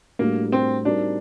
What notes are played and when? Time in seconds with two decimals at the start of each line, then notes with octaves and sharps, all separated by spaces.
0.19 A2 G3 A#3 D4 F#4 A#4
0.52 C4
0.85 G3 C4 D4 D#4 F#4 A#4